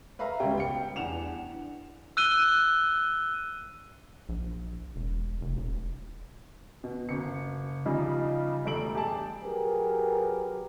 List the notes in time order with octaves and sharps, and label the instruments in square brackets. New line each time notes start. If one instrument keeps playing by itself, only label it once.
[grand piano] B4 E5 F5 A#5
C#2 B2 G3 C#4 G5
G5 C#7
E2 D4 F#5 E7 F7
[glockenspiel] E6 F#6 D#7 G7
[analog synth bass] A#1
E1
F1
D#1
[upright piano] B2
F#1 C#7
C#3 F3 G3 D#4
E1 G3 A3 D7 F#7
G4 G#4 G5 A5
[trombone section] F#3 G4 G#4 A#4 B4